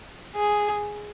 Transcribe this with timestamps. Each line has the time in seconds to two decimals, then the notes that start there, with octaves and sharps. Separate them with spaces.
0.36 G#4